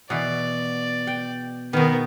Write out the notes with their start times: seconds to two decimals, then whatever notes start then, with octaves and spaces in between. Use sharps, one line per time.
0.10 B2 E3 D5
1.07 G5
1.73 B2 D#3 B3 A#4